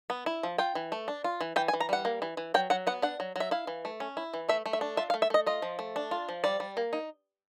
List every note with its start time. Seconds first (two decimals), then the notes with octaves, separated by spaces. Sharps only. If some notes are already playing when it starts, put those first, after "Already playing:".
0.10 B3
0.26 E4
0.43 F3
0.58 F4 G5
0.75 E3
0.92 A3
1.08 D4
1.24 F4
1.41 E3
1.56 E3 G5
1.68 G#5
1.73 E3
1.80 A#5
1.89 G3 F#5
2.05 A#3
2.22 E3
2.37 E3
2.54 F#3 G5
2.70 F#3 F#5
2.87 B3 F#5
3.02 D4 F#5
3.20 F#3
3.36 F#3 E5
3.51 E4 F5
3.67 E3
3.85 A3
4.00 C#4
4.17 E4
4.34 E3
4.49 A3 E5
4.66 A3
4.73 E5
4.81 D4
4.97 F4 E5
5.10 F5
5.14 A3
5.22 E5
5.30 A3 D#5
5.46 F4 D#5
5.62 F3
5.79 A3
5.96 D4
6.11 F4
6.29 F3
6.44 G3 D5
6.60 G3
6.77 A#3
6.93 D#4